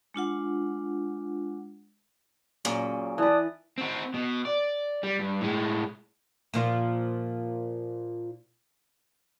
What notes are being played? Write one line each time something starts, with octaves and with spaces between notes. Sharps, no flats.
G#3 D4 F4 F#5
F#2 A#2 C#3
E3 B4 D5 A5 D#6
C4 F#4
B2
D5
G3
G2
A2 G#3
A#2 F3 F4